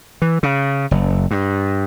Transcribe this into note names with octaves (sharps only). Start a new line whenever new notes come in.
E3
C#3
F#1
G2